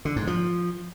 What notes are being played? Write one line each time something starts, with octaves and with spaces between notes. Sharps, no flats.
D3
G#2
F3